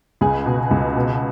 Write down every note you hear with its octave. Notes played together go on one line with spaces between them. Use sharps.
C#2 G#4
B2
C#2
B2